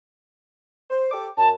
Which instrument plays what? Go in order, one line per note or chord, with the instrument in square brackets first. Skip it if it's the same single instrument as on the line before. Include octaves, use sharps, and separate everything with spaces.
[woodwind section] C5
G4 A4 D6
[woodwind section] F#2 [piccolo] A5